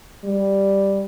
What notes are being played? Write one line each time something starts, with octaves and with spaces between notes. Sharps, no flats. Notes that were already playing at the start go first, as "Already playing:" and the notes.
G3